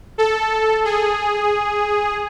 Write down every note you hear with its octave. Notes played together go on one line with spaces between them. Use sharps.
A4
G#4